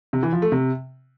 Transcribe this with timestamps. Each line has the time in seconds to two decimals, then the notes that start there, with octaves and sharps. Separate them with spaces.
0.13 C3
0.23 E3
0.32 F3
0.42 A3
0.52 C3